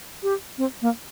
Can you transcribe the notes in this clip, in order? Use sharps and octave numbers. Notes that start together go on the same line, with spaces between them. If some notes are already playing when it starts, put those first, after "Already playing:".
G4
C4
A#3